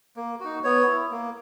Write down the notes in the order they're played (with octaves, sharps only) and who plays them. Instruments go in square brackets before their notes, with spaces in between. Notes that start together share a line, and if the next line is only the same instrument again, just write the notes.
[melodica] A#3
D#4 F#4
B3 C#5
E4
A#3